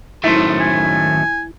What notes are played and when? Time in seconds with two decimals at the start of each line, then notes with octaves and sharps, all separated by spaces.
0.24 F#2 A2 D#3 A3 E4 C5
0.60 G#5